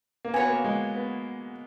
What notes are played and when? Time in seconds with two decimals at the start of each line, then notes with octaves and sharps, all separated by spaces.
0.25 A#3
0.34 B3 F#4 C#5 G#5
0.49 A#3
0.65 G#3
0.96 B3